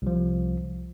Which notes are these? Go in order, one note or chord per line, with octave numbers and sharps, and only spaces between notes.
C2 F3